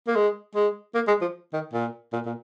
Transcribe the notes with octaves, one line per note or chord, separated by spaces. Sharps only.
A#3
G#3
G#3
A#3
G#3
F3
D#3
A#2
A#2
A#2